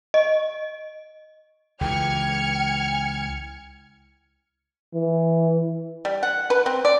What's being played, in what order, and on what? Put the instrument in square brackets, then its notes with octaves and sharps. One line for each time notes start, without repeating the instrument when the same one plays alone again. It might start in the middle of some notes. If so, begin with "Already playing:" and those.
[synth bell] D#5
[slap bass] C#2 E3 [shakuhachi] G5 [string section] F6 G#6 C#7
[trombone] E3
[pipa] G3
F#5
B4
C4
D5